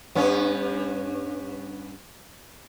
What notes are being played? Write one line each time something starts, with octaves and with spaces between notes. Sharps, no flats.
G2 B3 C#4